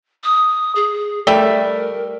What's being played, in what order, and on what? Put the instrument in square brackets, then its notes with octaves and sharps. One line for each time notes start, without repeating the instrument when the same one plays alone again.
[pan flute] D#6
G#4
[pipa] G3 E5 [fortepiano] A3 [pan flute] A#4